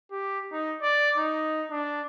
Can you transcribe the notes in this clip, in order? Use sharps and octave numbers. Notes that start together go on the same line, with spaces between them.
G4
D#4
D5
D#4
D4